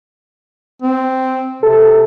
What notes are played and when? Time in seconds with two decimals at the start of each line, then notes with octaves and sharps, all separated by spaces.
0.82 C4
1.63 C3 A4